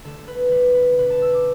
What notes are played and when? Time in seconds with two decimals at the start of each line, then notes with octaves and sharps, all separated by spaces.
0.04 D3 A3 A4
0.28 B4
0.51 D3 G3 B4
0.75 B4
0.98 B2 G3 B4
1.10 A5
1.22 E6
1.33 D6